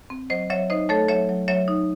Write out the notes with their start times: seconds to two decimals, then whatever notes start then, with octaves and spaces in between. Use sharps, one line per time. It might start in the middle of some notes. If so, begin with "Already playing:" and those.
0.10 C4
0.30 F#3 C5 D#5
0.50 F#3 C#5 E5
0.70 D#4 C5 D#5
0.89 A3 A4 C#5
1.09 F#3 C#5 E5
1.29 F#3
1.48 F#3 C#5 E5
1.68 D#4